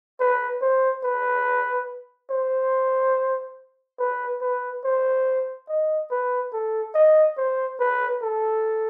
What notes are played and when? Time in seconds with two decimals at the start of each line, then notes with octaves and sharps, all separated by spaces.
0.20 B4
0.62 C5
1.04 B4
2.30 C5
3.99 B4
4.41 B4
4.84 C5
5.69 D#5
6.11 B4
6.53 A4
6.95 D#5
7.37 C5
7.80 B4
8.22 A4